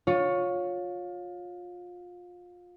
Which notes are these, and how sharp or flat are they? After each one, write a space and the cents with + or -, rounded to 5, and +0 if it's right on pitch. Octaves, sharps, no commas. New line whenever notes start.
F4 +25 C#5 +0